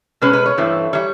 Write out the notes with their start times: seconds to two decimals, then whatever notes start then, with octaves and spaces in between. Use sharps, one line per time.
0.22 B2 G#3 C#4 B4
0.33 B4
0.46 C#5
0.57 G2 E3 A3 C4
0.93 E3 G3 C#5